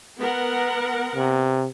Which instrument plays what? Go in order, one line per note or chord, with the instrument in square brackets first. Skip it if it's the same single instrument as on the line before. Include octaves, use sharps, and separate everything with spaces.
[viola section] B3 A#4 F#5
[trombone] C3